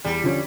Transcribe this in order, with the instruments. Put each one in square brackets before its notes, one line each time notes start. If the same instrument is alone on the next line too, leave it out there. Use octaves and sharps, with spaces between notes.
[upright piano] E2 [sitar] G3
[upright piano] D3 F3 C#4